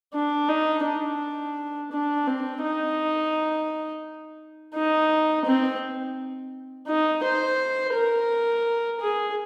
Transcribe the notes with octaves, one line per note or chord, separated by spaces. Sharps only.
D4
D#4
D4
D4
C4
D#4
D#4
C4
D#4
C5
A#4
G#4